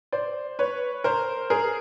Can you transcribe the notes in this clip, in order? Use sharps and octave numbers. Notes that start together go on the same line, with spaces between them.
C5 D5
B4 C#5
A#4 C5
G#4 A#4